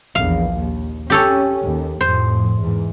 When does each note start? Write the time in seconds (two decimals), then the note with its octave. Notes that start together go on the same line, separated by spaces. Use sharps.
0.15 A#1 E2 F5
0.56 D#2
1.10 C#4 G4 A4 C#5
1.64 D#2
2.01 F2 A2 C5
2.59 E2 G#2